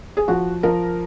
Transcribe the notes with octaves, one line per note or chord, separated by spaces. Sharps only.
G#4
F3 F#4
F3 A#4